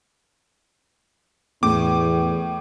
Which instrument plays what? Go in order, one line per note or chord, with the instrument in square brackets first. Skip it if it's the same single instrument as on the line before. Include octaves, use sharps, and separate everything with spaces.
[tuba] E2 [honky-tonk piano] A2 [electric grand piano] D6